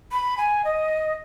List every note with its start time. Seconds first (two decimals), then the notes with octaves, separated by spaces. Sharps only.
0.12 B5
0.38 G#5
0.65 D#5